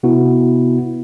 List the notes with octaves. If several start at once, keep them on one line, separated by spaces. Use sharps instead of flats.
C3 B3 E4 F#4